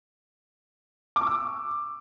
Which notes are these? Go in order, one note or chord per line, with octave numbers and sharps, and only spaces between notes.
D6
C#6
E6